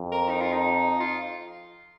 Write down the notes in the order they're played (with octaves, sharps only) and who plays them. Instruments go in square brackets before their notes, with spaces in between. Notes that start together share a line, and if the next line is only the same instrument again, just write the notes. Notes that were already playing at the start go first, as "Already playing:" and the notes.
Already playing: [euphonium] F2
[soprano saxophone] A#4
D#4
F4
D#4
F4